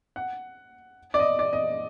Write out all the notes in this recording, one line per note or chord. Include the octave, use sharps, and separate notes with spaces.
F#5
D5
D#5
D5
D#5